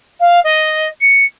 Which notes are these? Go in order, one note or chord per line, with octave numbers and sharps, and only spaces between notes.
F5
D#5
C#7